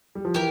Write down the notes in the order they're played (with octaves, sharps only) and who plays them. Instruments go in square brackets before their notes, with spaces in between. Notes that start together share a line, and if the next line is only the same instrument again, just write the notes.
[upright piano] G3
F3
[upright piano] E3 [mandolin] G4 A#4